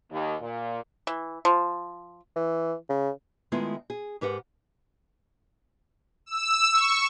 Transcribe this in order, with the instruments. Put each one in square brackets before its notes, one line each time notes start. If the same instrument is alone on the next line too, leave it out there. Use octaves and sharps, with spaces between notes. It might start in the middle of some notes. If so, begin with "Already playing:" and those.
[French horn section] D#2
A#2
[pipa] E3
F3
[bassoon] E3
C#3
[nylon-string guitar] D#3 G#3 A3 B3 E4 F4
G#4
G#2 G4 A#4 B4 F#5
[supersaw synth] E6
C#6